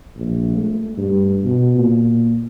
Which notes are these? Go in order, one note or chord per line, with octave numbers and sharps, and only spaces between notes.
A#1
A3
G2
B2
A#2